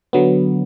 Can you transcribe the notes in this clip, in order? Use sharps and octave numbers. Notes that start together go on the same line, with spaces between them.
D3 F#3 B3